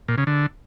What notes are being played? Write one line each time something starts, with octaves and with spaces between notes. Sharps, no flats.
A#2
C#3
D3